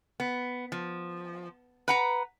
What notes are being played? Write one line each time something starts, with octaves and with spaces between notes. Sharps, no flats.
B3
F3
B4 F#5 A#5